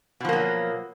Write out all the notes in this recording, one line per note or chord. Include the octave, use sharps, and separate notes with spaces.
B2 F3 F#3 A#3